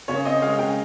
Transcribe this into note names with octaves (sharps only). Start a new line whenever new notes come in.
C#3 C#5
C4 D#5
G#3 F5
C#3 G5